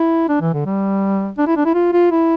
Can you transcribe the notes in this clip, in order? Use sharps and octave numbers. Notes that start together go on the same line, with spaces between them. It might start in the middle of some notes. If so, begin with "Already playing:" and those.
Already playing: E4
D4
E3
D3
G3
D4
E4
D4
E4
F4
F4
E4